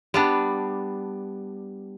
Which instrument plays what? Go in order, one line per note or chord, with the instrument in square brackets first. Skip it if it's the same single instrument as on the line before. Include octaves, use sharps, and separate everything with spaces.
[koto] G3 B3 D4